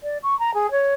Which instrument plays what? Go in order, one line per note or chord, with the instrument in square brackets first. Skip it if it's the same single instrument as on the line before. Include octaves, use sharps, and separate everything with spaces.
[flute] D5
C#6
A#5
G#4
C#5